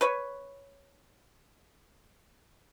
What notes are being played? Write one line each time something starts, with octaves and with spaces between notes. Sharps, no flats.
B4 C#5